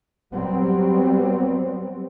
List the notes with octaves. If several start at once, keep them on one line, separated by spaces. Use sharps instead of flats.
F#3 G3 B3 C4